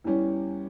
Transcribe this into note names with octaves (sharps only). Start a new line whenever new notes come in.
E2 E3 G3 C#4